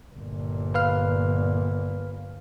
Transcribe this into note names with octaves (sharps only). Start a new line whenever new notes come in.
G1 A#2
B4 F5 F6